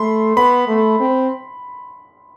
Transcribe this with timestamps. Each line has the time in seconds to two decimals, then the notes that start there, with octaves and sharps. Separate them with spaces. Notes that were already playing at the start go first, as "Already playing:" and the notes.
Already playing: A3 B5 C6
0.37 B3 B5
0.67 A3
1.00 C4